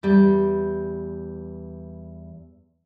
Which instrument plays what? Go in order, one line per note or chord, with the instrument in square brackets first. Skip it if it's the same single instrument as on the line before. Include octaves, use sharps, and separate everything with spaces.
[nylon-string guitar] E2 G3